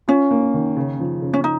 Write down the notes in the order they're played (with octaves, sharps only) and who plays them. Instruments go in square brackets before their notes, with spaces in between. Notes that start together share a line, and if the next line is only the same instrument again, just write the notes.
[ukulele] C#4 [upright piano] F4
[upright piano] A#3
D#3
C#3
F3
C#3
[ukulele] C#4
D#4